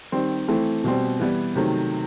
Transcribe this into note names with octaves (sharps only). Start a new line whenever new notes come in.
D#3 G3 C4
E3 A3 C4
B2 G3 C4
E3 G3 B3 E4
C3 D#3 F#3 A3